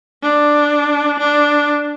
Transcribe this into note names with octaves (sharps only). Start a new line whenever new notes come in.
D4
D4